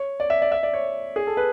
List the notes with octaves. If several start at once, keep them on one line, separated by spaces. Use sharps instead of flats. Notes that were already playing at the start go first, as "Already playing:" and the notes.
Already playing: C#5
D5
E5
D5
E5
D5
C#5
G#4
A4
B4